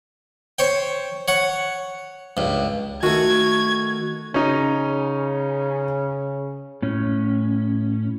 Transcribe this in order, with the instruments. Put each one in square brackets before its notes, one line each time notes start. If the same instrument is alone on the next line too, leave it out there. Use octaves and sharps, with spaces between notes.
[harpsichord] C5 C#5 G5
C#5 F#5
C#2 G2
[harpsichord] D#3 A3 [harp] F#4 [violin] G#6
[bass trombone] C#3 [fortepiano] C#4 D#4
[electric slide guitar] A2 C#4